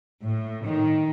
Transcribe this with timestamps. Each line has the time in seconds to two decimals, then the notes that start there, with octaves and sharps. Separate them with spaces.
0.22 A2
0.64 D#3